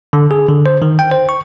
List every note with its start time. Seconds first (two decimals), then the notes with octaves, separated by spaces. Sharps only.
0.13 D3
0.31 G#4
0.49 D3
0.66 C5
0.82 D#3
0.99 G5
1.11 C5
1.29 C#6